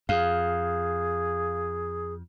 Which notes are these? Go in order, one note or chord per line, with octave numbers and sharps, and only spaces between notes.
F2 G#4 F5